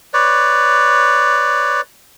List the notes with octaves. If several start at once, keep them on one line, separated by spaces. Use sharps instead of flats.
B4 C#5 D5